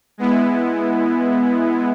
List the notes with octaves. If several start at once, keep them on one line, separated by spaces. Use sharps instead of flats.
G#3 B3 E4